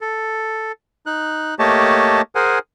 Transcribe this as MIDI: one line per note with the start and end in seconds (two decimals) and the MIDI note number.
0.01 0.72 69
1.06 1.55 63
1.06 1.55 90
1.59 2.22 57
1.59 2.22 58
1.59 2.22 67
1.59 2.22 73
1.59 2.22 75
1.59 2.22 81
2.35 2.59 68
2.35 2.59 70
2.35 2.59 72
2.35 2.59 78
2.35 2.59 80